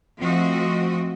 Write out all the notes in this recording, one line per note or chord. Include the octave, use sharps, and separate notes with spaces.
F3 A3 C4 F#4 D#5